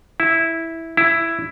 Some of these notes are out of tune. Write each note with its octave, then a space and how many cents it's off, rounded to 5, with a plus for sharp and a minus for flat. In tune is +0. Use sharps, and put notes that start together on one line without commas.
E4 -5
E4 +10